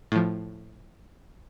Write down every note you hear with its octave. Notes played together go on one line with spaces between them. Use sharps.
A2 F3